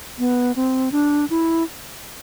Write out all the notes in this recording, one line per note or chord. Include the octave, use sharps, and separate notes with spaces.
B3
C4
D4
E4